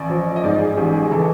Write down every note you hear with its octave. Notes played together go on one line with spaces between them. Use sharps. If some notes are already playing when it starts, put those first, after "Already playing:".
Already playing: A1 D5
F3
D#5
G#2 D5
G#4
A1 G4
G#4
E3 A4